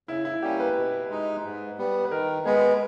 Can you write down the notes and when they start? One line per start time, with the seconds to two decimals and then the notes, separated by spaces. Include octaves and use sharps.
0.08 C#3 E4
0.25 E4
0.42 G3 A#3 C#4 G4
0.60 B4
0.76 B2
1.10 G#3 D#4
1.44 G#2
1.78 G3 B3
2.05 B4
2.11 D#3 A#4
2.45 G#3 B3 G#4